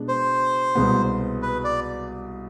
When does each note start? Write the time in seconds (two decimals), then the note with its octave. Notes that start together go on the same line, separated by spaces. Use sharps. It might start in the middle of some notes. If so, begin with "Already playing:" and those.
Already playing: B2 G#3 D4
0.08 C5
0.75 C2 B2 G#3 B3
1.42 B4
1.64 D5